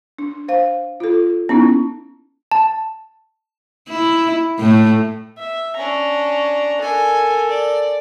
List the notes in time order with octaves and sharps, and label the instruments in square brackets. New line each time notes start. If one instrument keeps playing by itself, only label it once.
[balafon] D4
C5 F5
F4 A4
B3 C#4 D#4 E4
[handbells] A5
[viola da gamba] E4
A2 A3
[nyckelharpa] E5
[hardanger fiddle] C#4 D4 [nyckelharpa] A#5
[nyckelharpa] A4 A#4 [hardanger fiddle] G#5
[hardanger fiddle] D5